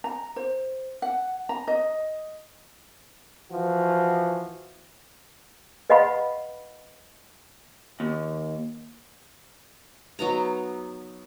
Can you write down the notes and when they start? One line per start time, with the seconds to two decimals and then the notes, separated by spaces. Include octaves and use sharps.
0.04 A#5
0.36 C5
1.02 F#5
1.49 A#5
1.68 D#5
3.51 E3 F3 F#4
5.90 B4 D#5 F5 F#5 B5
8.00 D#2
10.19 F#3 B3 D#4 A#5